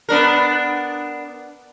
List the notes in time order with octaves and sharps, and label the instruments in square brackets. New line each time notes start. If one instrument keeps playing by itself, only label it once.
[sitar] B3 D4 A#4